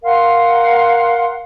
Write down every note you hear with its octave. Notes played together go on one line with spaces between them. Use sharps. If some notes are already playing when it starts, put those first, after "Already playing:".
A#4 F5 F#5 C6